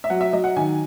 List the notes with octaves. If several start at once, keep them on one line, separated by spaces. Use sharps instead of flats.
E5
F#3 F#5
E5
F#3 D#5
F#5
D#3 G#5